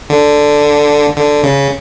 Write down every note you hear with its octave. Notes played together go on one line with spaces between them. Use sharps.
D3
D3
C#3